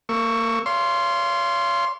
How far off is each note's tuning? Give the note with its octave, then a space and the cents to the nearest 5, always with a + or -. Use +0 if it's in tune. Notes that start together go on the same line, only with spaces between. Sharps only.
A#3 -30 C#6 +5 E6 +5
C#5 +40 F5 -25 C6 +0